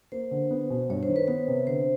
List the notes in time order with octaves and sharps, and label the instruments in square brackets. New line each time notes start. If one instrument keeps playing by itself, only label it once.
[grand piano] A#3 [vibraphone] C5
[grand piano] D3
B3
B2
[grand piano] G2 [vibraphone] C#5
[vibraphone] C5
[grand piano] D#3
[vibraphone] B4
[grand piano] B3 [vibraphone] B4
[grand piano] C3
[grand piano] D3 [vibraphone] C5